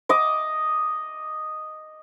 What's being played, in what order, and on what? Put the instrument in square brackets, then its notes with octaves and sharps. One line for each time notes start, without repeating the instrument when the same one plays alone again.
[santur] D#5 D6